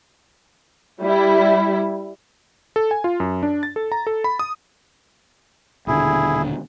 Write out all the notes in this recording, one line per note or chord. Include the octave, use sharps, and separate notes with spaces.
G3 E4
A4
G#5
F4
F#2
D4
A6
A4
A#5
A4
B5
D#6
D#1 B2 D3 E4 G#4